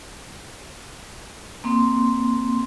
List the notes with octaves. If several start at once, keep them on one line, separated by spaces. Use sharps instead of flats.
A#3 C4 C6